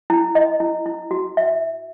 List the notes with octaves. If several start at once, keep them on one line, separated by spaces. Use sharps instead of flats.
E4
D#5
E4
E4
F#4
E5